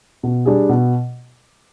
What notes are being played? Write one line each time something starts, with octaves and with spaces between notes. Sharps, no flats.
B2
G3 D4 G#4
B2